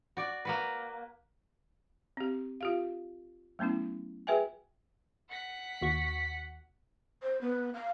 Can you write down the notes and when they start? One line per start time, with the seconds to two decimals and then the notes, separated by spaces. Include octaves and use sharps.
0.17 F#4 D5
0.45 A#3 F#4 B4
2.17 C4 G4
2.61 F4 G4 F5
3.59 F#3 A3 B3 C#4 E4
4.27 F#4 G#4 B4 E5 G5 G#5
5.30 F#5 B6
5.81 D#2 F#4 C#6
7.22 C5
7.41 B3
7.74 F5